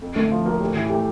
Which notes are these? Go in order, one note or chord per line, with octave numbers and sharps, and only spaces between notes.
F2
D3 A3
F3
A#3 F#4
A2 G4
E3
A3 G4